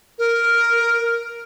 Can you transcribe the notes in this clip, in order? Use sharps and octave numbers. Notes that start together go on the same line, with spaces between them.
A#4